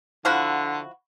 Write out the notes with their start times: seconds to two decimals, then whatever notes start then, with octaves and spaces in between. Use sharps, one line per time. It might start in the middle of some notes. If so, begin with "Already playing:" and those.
0.25 D3 F3 E4 F#4